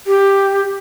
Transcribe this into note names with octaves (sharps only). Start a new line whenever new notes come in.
G4